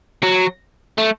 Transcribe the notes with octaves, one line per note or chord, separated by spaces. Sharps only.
F#3
A3